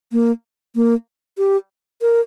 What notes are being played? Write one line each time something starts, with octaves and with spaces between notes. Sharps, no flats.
A#3
A#3
G4
A#4